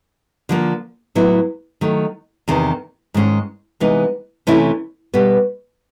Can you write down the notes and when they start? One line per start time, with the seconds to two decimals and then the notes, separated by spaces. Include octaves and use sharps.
0.49 D3 F3 A#3
1.15 A2 F#3 B3 E4
1.81 D#3 F#3 A3
2.48 E2 C3 D#3
3.14 G#2 D#3 G#3 C#4
3.80 C3 E3 G#3 B3 D#4
4.47 C3 E3 A3 C#4 E4
5.14 B2 G3 B3